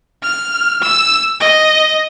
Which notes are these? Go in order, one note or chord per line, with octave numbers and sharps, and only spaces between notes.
F6
E6
D#5